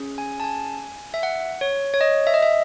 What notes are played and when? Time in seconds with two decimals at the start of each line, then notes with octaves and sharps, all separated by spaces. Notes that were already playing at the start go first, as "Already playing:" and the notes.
Already playing: C#4 G#4
0.18 G#5
0.40 A5
0.44 G#5
1.14 E5
1.23 F#5
1.61 C#5
1.94 C#5
2.01 D#5
2.27 E5
2.34 D#5
2.42 E5